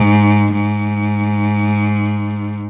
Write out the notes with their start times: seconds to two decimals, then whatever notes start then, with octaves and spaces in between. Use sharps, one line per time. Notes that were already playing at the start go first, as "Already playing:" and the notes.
Already playing: G#2
0.53 G#2